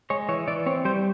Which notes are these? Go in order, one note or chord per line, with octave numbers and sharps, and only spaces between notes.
G#3 C#5
E3 C#5
E3 D5
C4 C#5
G3 C5